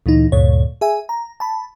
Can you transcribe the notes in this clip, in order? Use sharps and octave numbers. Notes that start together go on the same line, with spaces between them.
D2 A#2 E3 D#4
D2 G2 A#2 C#5
G#4 E5 G#5
A#5
A5 B5